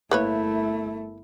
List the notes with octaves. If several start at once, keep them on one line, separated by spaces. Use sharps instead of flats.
G1 A3 A#3 E4 B4 C#5